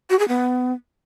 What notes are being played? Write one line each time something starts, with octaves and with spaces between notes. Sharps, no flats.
F#4
G#4
B3